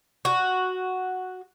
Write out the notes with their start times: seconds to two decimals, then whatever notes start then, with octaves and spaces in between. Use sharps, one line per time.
0.25 F#4